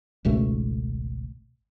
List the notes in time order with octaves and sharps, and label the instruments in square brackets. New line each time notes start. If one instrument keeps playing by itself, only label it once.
[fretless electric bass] G#1 C#2 B2 A3